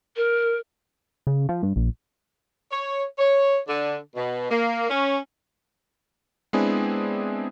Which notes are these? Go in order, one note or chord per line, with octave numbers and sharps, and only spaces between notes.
A#4
C#3
F3
G2
A#1
C#5
C#5
D3
B2
A#3
C#4
G#3 B3 C4 D4 E4 G#4